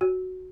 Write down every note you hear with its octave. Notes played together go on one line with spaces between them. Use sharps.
F#4